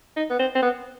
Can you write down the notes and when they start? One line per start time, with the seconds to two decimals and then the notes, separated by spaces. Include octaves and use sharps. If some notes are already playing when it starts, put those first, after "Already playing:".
0.16 D#4
0.30 B3
0.39 C4
0.55 C4
0.62 B3